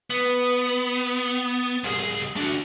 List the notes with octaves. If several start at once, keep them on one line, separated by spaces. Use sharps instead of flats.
B3
C2 G#4
D4 F#4